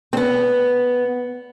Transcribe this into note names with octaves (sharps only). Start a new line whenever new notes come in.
C4
B3